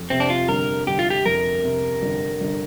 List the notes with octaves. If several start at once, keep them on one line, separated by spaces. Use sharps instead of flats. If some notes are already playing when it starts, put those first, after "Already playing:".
Already playing: F2
C3 C4
D4
F4
G1 A#4
G1 G4
F4
G4
F2 A#4
C3
G1
G1